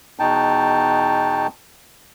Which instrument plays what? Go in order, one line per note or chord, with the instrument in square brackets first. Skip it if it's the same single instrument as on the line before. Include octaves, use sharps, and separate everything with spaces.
[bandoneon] E2 B2 D#4 G5 A5